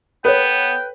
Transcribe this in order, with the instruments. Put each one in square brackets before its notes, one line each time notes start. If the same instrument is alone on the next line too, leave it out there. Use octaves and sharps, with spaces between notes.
[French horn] B3 [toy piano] A4 C#5 [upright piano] B4 [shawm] G5